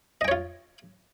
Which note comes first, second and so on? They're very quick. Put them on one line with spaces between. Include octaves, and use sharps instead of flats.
D#5 G5 C#5 F4